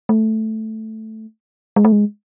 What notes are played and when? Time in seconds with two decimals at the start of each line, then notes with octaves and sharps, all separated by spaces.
0.09 A3
1.76 G#3
1.85 A3
1.92 G#3